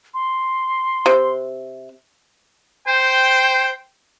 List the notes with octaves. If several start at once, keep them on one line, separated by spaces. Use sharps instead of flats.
C6
C3
C5 G5